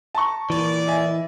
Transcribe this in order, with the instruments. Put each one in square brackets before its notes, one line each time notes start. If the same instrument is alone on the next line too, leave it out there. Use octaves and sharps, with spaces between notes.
[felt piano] A5 A#5 C#6
[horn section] A#2 D5 [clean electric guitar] E3
[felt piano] D#5 E5 G#5